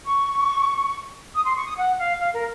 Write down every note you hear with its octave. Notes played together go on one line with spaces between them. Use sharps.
C#6
D#6
C6
C#6
D#6
F#5
F5
F5
A#4